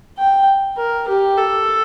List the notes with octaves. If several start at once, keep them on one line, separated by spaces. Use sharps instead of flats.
G5
A#4
G4
A4